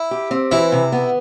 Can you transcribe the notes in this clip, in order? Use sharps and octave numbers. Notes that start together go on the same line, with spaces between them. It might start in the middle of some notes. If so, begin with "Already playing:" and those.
Already playing: E4
G4
C4
E3 E4
C3
B3